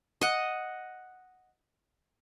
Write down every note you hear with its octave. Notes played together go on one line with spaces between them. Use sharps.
D#5 F#5